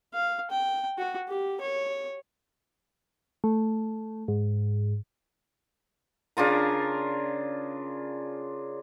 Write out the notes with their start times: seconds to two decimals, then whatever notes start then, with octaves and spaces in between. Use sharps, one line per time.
0.13 F5
0.51 G5
0.98 F#4
1.28 G4
1.61 C#5
3.44 A3
4.28 G#2
6.37 C#3 D4 F4 A#4